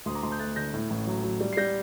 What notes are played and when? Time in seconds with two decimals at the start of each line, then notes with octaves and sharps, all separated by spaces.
0.06 D2 C6 D#6
0.15 A#5 D6
0.22 D2 A5 C6
0.31 D#6 G6
0.40 A3 F#6 A6
0.56 D3 G6 A#6
0.73 A2
0.90 A1
1.07 F#3
1.23 F#3
1.41 G3
1.53 C7
1.57 G3 G6 A#6